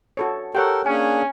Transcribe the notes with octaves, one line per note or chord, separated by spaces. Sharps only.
F#4 A4 C#5
G4 A4 A#4 C#5 F#5 G5
A#3 C#4 D4 G#4 G#5